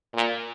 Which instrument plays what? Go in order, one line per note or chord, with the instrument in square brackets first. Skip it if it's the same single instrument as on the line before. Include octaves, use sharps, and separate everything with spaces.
[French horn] A#2